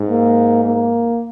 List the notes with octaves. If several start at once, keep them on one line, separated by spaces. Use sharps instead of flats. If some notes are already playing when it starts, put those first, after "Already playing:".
Already playing: G#2
A#3
A#3